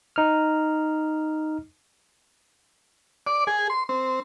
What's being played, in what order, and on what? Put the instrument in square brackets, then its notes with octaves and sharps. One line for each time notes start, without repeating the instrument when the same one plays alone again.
[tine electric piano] D#4 F6
[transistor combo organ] D5
G#4
C6
C4